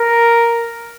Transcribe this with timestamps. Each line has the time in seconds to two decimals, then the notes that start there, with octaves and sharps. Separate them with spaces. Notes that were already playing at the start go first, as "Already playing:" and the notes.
Already playing: A#4